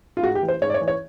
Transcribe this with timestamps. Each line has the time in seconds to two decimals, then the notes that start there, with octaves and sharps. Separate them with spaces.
0.17 F4
0.23 G#2 F#4
0.35 G4
0.43 E3
0.48 C5
0.61 G#2 C#5
0.70 D5
0.74 C#5
0.81 E3
0.88 C#5